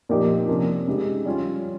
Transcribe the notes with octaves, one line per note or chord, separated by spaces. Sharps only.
A#2 F3 A#3 D#4 G4
C3 F3 A#3 C#4
C#3 G#3 D#4 G4
G3 C#4 F4